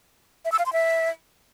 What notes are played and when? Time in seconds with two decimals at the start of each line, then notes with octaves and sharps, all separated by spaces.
0.45 E5
0.52 E6
0.59 F5
0.66 C6
0.73 E5